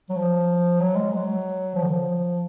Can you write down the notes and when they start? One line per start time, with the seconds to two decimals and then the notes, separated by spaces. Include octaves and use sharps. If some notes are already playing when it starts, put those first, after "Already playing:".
0.09 F#3
0.17 F3
0.80 F#3
0.96 G#3
1.12 F#3
1.75 F3
1.83 D3
1.90 F3